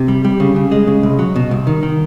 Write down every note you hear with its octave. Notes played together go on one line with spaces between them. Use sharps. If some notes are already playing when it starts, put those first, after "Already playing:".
Already playing: C3
G3
G3
C#3
C#3
G#3
C#3
C2
F#3
B2
C2
D#3
D#3